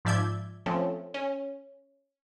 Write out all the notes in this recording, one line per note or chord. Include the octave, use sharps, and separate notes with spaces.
G#2 F3 D5 E5 G6 G#6
F3 A3 C4 C#4
C#4